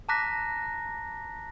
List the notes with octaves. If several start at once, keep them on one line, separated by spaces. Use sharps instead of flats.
A5 A#5 D6 F#6 A#6 B6